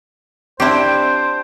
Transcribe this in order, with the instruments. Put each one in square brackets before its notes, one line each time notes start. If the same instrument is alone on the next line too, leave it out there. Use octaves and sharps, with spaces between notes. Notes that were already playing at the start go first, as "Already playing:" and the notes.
[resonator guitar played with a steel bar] C4 D4 [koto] E4 G4 [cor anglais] C5